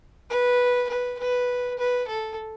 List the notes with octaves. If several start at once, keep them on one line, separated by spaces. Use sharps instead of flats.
B4
B4
B4
B4
A4